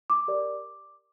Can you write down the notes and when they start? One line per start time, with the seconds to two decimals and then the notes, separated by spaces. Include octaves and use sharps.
0.10 D6
0.28 G4 A#4 D5